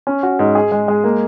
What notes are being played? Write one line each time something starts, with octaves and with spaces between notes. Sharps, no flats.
C#4
F#4
G#2
G#4
G#3
G#3
A#3